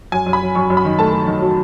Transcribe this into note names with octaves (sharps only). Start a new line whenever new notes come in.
F#2 G#5
F#2
B5
F#3
F#2 C#6
F#2
B5
D#3
A3 A5
A3
D#3
F#3